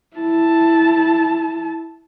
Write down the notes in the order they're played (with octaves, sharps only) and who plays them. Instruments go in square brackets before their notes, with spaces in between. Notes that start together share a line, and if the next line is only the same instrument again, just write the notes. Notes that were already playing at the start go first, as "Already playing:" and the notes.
[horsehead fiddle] E4 A5